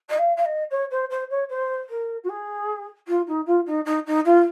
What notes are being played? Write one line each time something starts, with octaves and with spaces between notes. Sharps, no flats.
D#5
F5
F5
D#5
C#5
C5
C5
C#5
C5
A#4
F#4
G#4
F4
D#4
F4
D#4
D#4
D#4
F4